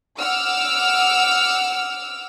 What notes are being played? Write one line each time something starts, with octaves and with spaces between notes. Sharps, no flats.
F#5 D6 E6 F6